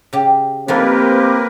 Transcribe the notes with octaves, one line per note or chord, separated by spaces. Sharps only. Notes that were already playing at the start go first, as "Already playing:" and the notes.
C#3 G4
F3 A3 A#3 C4 D#4 G4 A#4 B4